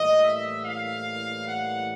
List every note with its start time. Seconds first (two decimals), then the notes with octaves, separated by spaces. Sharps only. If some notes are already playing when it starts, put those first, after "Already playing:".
Already playing: A2 E3 G3 A#3 D#5
0.23 E5
0.65 F5
1.48 F#5